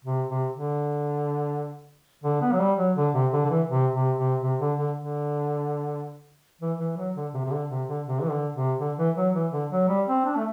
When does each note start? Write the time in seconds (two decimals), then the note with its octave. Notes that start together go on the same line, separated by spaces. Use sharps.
0.05 C3
0.28 C3
0.53 D3
2.24 D3
2.41 B3
2.52 F#3
2.60 G3
2.78 F#3
2.96 D3
3.14 C3
3.33 D3
3.45 D3
3.50 E3
3.69 C3
3.94 C3
4.17 C3
4.42 C3
4.60 D3
4.78 D3
4.97 D3
6.61 E3
6.79 E3
6.97 F#3
7.15 D3
7.34 C3
7.45 C3
7.51 D3
7.70 C3
7.88 D3
8.06 C3
8.22 E3
8.30 D3
8.55 C3
8.79 D3
8.98 E3
9.17 F#3
9.34 E3
9.52 D3
9.71 F#3
9.89 G3
10.08 C4
10.25 D4
10.37 A3